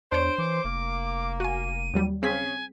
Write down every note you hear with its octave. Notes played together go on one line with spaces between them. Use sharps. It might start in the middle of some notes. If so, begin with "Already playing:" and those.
E2 D4 C5 C#5 D7
E3 D6
F1 A#3
F#4 G#5 D#7
D#2 F#3 G3
C#3 C4 G#4 G#5 B6